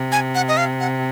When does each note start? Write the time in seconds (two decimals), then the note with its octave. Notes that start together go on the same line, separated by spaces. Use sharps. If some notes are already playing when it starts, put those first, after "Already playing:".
Already playing: C3
0.12 G#5
0.35 F#5
0.48 D#5
0.57 F5
0.80 F#5